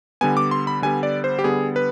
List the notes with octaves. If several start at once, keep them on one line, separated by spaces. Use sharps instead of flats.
D3 G3 B3 G#5
D6
C6
B5
D3 G3 B3 G#5
D5
C5
G4
D3 G3 B3 G#4
B4